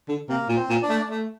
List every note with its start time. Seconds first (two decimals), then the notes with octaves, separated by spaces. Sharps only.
0.09 D3
0.29 C3 A#3 A#4
0.49 A#2
0.56 C4 C5
0.69 A#2
0.82 D4 D5
0.89 A3
1.10 A3